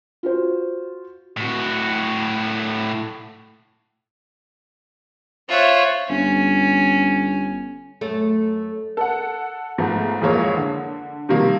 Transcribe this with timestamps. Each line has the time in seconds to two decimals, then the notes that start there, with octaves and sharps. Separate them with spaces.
0.23 F4 F#4 C5
1.37 A2 F#4
5.49 F4 C5 C#5 E5 F#5
6.09 G1 C#4
8.01 F#2 A3 A4
8.97 A4 F#5
9.78 G#2 F3 A3 B3
10.21 A1 F2 G#3 A#3 C#5
10.57 D3
11.29 C3 D#3 F3 G3 A#3